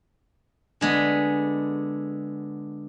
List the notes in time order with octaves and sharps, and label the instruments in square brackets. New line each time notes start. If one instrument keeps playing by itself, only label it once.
[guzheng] D3 G#3 B3